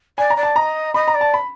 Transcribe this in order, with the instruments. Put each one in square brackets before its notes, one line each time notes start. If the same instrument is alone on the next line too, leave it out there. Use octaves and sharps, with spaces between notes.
[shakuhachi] D5 [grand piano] G#5
[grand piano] A#5
[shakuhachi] D5
[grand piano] A5
[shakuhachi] D#5 [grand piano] A#5
[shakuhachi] D#5 [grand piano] B5
[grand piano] A#5
[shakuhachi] D5
[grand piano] A5
B5